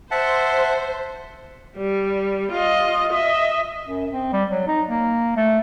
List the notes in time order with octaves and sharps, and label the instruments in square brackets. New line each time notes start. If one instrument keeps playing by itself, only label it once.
[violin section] C5 [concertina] E5 F#5 A5
[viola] G3
F4 D#5
D#5 E5
[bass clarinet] F#2
C4
G3
F#3
D#4
A#3
A3